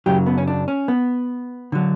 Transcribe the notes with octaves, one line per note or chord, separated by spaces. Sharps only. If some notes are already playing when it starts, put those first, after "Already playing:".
F#2 C#3 F#3 G4
B3
C#4
D4
C#4
B3
D3 F#3